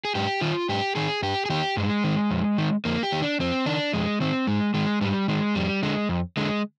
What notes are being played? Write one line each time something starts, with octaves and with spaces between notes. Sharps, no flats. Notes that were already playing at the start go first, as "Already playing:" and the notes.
G#4
G#2 G4
D#3 F4
G#2 G4
D#3 G#4
G2 G4
G#4
D#3 G4
G2 G#3
D#3
F2
D#3
F2 A#3
G4
D#3
D4
F2 C4
D#3 D4
F2 G#3
D#3 C4
G#2 G#3
D#3 G#3
G#2 G3
D#3 G#3
F2 G3
D3 G#3
F2
D3 G#3